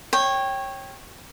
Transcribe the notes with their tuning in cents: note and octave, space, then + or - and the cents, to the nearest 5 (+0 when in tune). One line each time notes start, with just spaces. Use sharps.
C#5 -20 G5 +0